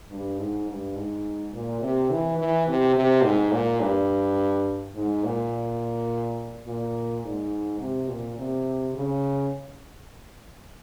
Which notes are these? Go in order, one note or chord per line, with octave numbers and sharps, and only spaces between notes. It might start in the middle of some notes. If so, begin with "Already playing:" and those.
G2
G#2
G2
G#2
A#2
C3
E3
E3
C3
C3
G#2
A#2
G2
G#2
A#2
A#2
G#2
C3
A#2
C3
C#3